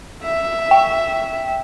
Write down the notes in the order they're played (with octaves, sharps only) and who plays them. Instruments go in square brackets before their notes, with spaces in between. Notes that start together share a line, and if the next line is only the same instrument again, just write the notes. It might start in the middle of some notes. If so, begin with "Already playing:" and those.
[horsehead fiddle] E5
[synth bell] G5